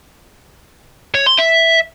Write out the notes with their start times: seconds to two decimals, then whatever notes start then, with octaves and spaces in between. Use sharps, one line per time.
1.15 C#5
1.27 C6
1.39 E5